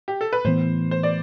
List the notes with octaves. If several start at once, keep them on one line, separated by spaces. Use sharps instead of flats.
G4
A4
B4
A2 E3 B3 C5
C5
D5